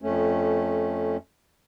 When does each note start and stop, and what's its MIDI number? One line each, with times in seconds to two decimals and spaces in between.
0.02 1.17 41
0.02 1.17 57
0.02 1.17 61